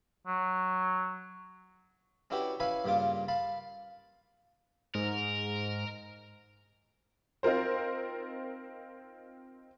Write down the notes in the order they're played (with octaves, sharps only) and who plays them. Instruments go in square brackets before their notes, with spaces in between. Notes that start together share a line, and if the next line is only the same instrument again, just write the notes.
[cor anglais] F#3
[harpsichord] C#4 D4 E4 F#4 G4 B4
C#4 E4 B4 F5 G#5 B5
G2 A#2 C#3 F4 D6
F5 A5 B5
[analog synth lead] G#2 [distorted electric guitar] A#4
[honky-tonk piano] C4 D#4 F4 A#4 C5